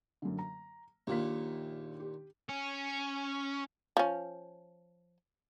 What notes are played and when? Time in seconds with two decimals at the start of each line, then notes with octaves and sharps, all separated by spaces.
0.22 F#2 D3
0.39 A#5
1.07 A#1 D#2 A#2 F5 B6
2.00 G4
2.49 C#4
3.97 F3 C#4